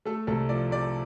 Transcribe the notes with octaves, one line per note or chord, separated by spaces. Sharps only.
A3 A4
C2 A4
F3 D5
C3 D5